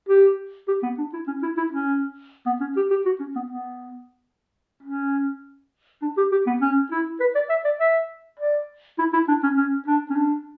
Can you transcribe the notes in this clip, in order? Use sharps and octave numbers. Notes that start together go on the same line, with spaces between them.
G4
G4
B3
D4
E4
C#4
E4
E4
C#4
B3
C#4
G4
G4
F#4
C#4
B3
B3
C#4
D4
G4
G4
B3
C#4
E4
B4
D5
E5
D5
E5
D5
E4
E4
D4
C#4
C#4
D4
C#4
D4